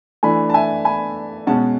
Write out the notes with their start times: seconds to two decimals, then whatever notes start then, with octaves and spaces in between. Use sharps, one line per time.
0.23 E3 A3 D4 G#5 B5
0.50 A5
0.54 E5 G#5
0.85 G#5 B5
1.47 B2 G#3 C#4 F#5 A5